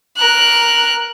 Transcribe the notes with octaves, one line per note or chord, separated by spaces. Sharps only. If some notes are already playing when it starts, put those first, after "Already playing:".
A#4 F#6